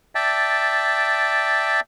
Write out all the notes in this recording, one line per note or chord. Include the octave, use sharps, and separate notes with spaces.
D5 E5 G5 A5